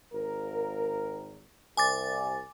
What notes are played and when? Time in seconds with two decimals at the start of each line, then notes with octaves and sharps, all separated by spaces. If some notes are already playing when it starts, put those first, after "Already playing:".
0.13 G#1 A#4
1.77 C2 G#5 D6 A6